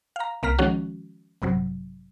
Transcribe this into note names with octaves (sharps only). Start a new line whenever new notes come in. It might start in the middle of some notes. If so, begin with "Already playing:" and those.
F5 A#5
C2 A#3 A#5 F6 B6
D#3 F3 G#3 C#4 F#4
A1 G2 C3 F#3